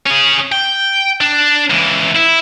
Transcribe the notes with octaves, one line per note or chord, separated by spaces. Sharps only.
C#4 G#4
G5
D4
C#2 E3
E4